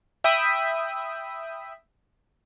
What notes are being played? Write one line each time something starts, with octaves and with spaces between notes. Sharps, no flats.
E5 G5 B5 D#6